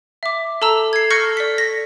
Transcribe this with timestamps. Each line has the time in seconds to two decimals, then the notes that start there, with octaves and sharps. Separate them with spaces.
0.23 E5 D6
0.62 A4 A5 A#5 E6
0.93 G#6 C7
1.11 A4 C#6 F6 G6 A#6 C#7
1.37 D5 B6
1.58 A#6